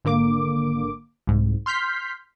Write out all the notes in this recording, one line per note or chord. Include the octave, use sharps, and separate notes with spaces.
G#1 D3 A#3 D6
C2 G#2
C6 F6 G6 B6 C7